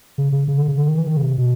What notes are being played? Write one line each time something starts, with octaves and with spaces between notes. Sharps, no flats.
C#3
C#3
C#3
D3
C#3
D3
D#3
E3
D#3
C#3
C3
B2